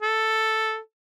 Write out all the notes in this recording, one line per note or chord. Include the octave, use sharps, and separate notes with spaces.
A4